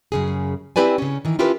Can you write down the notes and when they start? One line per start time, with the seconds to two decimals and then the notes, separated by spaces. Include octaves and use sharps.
0.12 F#2 C#3 G#4
0.76 C4 E4 G4 B4 D5 G#5
0.98 C#3 C#4
1.25 D#3 E3
1.39 C#4 E4 F4 G4 A#4 B4